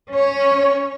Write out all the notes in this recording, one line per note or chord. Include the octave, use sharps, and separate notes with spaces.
C#4 C#5